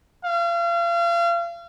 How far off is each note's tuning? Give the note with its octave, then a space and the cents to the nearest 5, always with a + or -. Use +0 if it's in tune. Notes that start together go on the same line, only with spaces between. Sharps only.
F5 -35